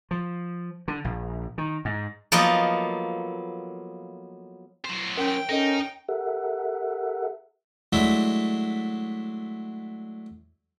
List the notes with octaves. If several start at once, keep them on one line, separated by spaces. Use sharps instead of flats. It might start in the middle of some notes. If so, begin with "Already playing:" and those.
F3
D3
A#1
D#3
G#2
F3 F#3 A#3 B3 A4 D#5
F#3 C5
C#4 A#4 G5
C#4 D#4 A4 A#4 D#5
G4 A4 A#4 E5 F#5
F#3 G#3 A3 D4 E4